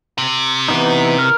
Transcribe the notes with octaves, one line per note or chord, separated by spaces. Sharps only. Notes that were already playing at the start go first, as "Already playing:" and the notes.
C3
E3 B3 D#4
A#4